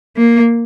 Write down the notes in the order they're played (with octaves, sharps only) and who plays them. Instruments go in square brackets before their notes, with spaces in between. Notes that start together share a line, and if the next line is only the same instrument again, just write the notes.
[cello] A#3